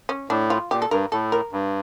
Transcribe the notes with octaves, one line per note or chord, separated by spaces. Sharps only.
C#4
A2 D4
F4
A#2 G4
A4
G2 A#4
A2 A4
A#4
G2